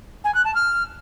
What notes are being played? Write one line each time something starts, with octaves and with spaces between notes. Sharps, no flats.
G#5
F#6
A5
F6